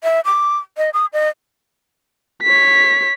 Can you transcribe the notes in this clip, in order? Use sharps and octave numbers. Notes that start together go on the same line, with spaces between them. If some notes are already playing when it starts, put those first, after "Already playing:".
E5
D6
D#5
D#6
D#5
C#5 B6